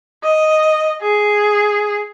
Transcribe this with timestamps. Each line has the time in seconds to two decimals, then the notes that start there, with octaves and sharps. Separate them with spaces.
0.23 D#5
1.02 G#4